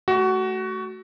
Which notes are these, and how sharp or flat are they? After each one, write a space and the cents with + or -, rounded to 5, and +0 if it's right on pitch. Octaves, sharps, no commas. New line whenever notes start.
A3 -10 F#4 +20